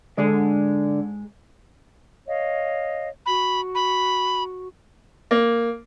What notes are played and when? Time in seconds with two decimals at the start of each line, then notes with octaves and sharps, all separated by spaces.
0.17 G#2 D3 G#3 G#4
2.27 C#5 D#5 F5
3.26 F#4 B5
3.75 B5
5.31 A#3